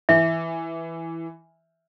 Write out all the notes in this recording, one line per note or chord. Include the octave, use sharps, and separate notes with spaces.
E3 E5